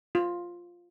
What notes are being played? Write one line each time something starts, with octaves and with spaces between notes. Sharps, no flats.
F4